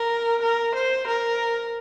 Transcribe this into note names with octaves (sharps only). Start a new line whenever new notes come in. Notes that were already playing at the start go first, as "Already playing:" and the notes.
Already playing: A#4
A#4
C5
A#4